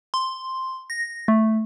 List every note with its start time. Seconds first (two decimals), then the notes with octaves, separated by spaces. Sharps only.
0.14 C6
0.90 A#6
1.28 A3